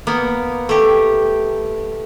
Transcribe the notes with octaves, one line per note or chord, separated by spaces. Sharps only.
A#3 B3
A3 G4